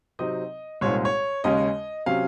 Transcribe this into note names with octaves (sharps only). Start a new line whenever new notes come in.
C3 F#3 C4 D#4 D#5
C2 A#2 G#3 C4 D#4 C#5
C#5
D#2 C#3 G#3 C#4 D#5
C3 F#3 C#4 F5